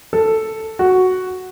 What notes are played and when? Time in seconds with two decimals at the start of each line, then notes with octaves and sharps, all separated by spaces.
0.13 A4
0.79 F#4